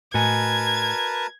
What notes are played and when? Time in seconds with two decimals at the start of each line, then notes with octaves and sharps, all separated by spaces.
0.14 A2 F#4 A#4 B4 D#5 G#5 A5 G#6